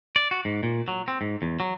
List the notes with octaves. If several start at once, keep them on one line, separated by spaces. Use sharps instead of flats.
D5
F#4
G#2
A#2
F#3
C4
G#2
E2
F#3